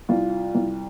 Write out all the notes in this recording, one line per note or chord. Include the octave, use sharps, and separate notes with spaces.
C2 F4
C2